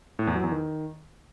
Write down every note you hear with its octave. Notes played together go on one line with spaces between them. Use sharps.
A2
E2
F#3
E2
D#3